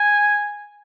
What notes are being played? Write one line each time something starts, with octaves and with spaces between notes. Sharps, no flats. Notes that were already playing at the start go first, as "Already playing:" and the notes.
Already playing: G#5